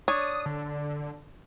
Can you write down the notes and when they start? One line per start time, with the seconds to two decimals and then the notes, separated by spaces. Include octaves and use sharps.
0.08 D4 C#5 D#6
0.46 D3